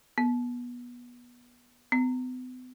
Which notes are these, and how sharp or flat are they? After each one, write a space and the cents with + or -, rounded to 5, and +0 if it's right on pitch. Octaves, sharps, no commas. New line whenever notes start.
B3 -20
B3 +45